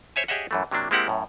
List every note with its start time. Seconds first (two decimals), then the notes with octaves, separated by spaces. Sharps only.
0.16 C5 C#5 E5 G#5
0.28 G4 G#4 C#5 D#5 E5 F#5
0.51 F#2 E3 A3
0.71 C3 F#3 A#3 D4
0.91 G#3 A#3 C4 E4 G4 F#5
1.08 F#2 A2